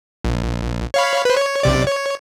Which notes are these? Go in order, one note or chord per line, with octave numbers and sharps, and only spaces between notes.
A#1
C#5 F5 B5
B4 C5
C#5
B1 C3 D5
C#5